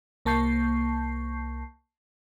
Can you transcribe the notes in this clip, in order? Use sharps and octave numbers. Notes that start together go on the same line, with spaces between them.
C2 A#3 A5 C#6 G6 C7